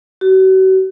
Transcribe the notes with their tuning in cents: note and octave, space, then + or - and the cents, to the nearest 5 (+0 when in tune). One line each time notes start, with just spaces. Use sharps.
F#4 +40